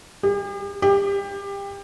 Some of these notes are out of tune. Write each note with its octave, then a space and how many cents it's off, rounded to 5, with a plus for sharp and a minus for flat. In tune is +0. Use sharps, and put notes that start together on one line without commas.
G4 +45
G4 +25